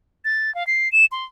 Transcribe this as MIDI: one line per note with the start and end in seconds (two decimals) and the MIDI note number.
0.25 0.53 93
0.55 0.66 77
0.67 0.91 96
0.92 1.05 100
1.12 1.25 84